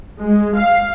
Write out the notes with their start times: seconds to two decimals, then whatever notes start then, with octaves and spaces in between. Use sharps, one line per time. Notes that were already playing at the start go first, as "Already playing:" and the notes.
0.22 G#3
0.57 F5